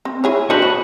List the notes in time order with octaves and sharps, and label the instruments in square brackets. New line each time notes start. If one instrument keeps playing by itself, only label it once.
[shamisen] C4
E4 G#4 C#5
[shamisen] D4 C5 D#5 [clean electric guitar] F#4 B4
[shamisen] C#5